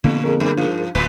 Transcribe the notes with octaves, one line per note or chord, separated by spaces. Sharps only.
F2 A#2 D3 A#3 B3
F2 G#4 A#4
F#2
G2 F3
D1 A2 B4